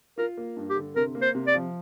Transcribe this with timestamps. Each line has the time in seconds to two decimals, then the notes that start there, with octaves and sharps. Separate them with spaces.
0.18 F4 A#4
0.37 A#3
0.56 G2
0.70 G4
0.76 D3
0.96 C3 A#4
1.15 A#3
1.22 C5
1.35 C3
1.47 D5
1.54 F3